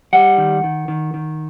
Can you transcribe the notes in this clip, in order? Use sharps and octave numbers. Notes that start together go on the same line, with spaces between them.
G3 F#5
D#3
D#3
D#3
D#3